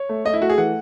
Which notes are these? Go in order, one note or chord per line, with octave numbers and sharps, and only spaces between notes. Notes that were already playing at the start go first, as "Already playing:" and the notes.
Already playing: C#5
A3
A3 D#5
E4
A3 F#4
G#4
E3 F#5